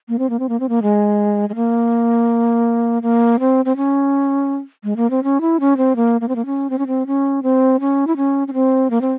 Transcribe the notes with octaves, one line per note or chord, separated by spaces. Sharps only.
A#3
C4
A#3
C4
A#3
C4
A#3
G#3
G#3
A#3
A#3
C4
C4
C#4
G#3
A#3
C4
C#4
E4
C#4
C4
A#3
A#3
C4
A#3
C#4
C4
C#4
C4
C#4
C4
C#4
E4
C#4
C#4
C4
A#3
C4